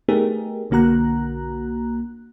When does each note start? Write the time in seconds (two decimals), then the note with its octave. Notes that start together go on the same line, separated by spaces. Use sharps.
0.08 A3 B3 D#4 G4 G#4 A#4
0.70 B1 D3 A#3 F#4 A#5 F#6